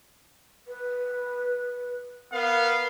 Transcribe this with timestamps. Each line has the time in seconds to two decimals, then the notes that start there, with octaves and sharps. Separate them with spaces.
0.68 B4
2.33 B3 A#4 F5